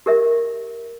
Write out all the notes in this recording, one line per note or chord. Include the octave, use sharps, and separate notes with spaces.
G4 A#4 E5